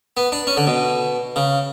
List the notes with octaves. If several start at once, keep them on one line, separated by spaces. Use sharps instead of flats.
B3
D4
C#4
D3
B2
C#3